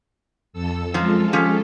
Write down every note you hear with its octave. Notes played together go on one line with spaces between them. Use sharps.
F2 A4 E6
F#2 F3 G#3 F4 A4
F3 C#4 G4